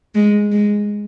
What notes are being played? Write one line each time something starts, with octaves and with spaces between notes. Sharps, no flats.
G#3
G#3